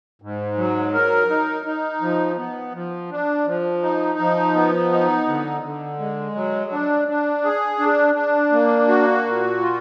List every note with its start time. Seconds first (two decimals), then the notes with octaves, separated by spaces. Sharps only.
0.22 G#2
0.57 F#3
0.94 A#4
1.30 D#4
1.66 D#4
2.01 F3
2.37 B3
2.74 F3
3.11 D4
3.47 F3
3.83 D#4
4.19 F3
4.55 B3
4.91 D#4
5.27 D3
5.62 D3
5.99 G#3
6.35 F#3
6.71 D4
7.08 D4
7.44 G#4
7.79 D4
8.15 D4
8.52 A#3
8.88 F#4
9.24 A#2
9.60 F4